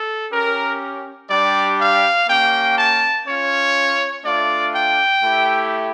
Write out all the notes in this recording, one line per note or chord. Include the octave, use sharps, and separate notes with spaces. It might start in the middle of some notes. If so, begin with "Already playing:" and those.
Already playing: A4
C#4 G4 A#4
G3 D4 G4 D5
F5
A#3 C#4 G4 G5
A5
C#4 F4 C#5
A3 D4 F4 D5
G5
A3 E4 G4